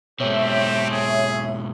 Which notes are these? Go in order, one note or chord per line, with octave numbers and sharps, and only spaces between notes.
G#2 B2 A3 C4 G4 C#5 E5
G#4